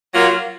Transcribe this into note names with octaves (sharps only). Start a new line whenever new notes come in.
F#3 A#3 F4